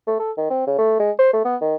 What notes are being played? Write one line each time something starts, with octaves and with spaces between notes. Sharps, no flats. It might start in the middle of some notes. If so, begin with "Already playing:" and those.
A3
A4
D#3
C4
C#3
A3
G#3
C5
A3
B3
D#3